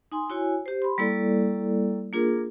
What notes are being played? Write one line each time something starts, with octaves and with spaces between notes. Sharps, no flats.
D#4 G#5 C6
E4 F#4 C#5 G#5
G4 C5
B5 C6
G3 A#3 E4 A4 D5
A#3 D4 F4 G#4 A#4